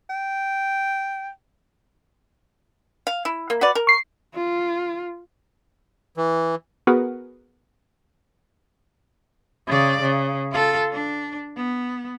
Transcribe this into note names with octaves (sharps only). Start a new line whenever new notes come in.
G5
F5
E4
A#3
F#4 B4 D5
A#4
C#6 C7
F4
E3
B3 F#4 G#4 A#4 B4 F#5
C#3 D5
C#3
F4 A4
D4
B3